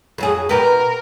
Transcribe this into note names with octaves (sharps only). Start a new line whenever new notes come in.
F2 F#3 G#4
B2 G4 A#4 B4